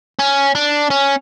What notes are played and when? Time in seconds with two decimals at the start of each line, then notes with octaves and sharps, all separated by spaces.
0.19 C#4
0.55 D4
0.90 C#4